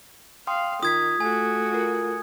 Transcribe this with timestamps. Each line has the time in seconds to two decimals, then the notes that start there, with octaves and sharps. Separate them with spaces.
0.47 F5 G5 C6 D#6
0.83 D#3 F4 D#6 G#6 B6
1.20 A3 F#4 G#5
1.73 F4 A#4